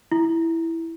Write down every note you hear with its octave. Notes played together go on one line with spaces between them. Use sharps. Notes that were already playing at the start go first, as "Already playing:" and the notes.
E4